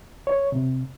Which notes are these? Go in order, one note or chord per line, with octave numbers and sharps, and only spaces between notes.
C#5
C3